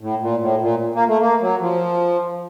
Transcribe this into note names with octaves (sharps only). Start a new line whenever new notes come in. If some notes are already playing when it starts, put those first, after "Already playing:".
A2
A#2
A2
A#2
A#3
A3
A#3
F#3
F3